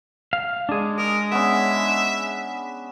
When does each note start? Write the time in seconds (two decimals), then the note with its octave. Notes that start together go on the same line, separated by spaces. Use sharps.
0.33 F5
0.69 G#3 D4 G#4
0.98 A#4 D#6
1.32 B3 C#4 E5